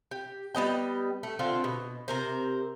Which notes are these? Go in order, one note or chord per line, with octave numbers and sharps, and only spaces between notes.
G4
G3 B3 D#5 G5
A3
D3 C4 F4
B2
C3 A#4 C5